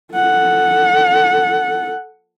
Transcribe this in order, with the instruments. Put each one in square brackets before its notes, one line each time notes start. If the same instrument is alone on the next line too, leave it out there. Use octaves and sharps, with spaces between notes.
[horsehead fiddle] A4 F#5